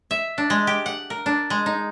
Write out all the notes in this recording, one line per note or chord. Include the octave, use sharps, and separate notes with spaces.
E5
D4
G#3
G4
F#5
A#4
D4
G#3
D#4